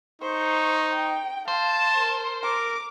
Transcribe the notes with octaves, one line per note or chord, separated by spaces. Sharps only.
D#4 C5 C#6
G5
C5 F5 A5
A#4
A#4 D6